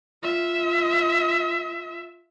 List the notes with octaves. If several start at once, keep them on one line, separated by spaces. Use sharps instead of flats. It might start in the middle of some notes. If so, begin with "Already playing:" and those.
F4 E5